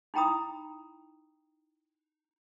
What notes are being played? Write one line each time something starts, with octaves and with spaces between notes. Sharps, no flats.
D#4 E4 G5 A#5 B5 D#6